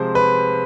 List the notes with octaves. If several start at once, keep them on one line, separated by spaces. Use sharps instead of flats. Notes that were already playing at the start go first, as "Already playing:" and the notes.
Already playing: C3 F3 G#3 C5
B4